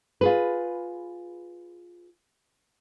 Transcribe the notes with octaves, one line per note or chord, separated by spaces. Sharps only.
F4 G#4 B4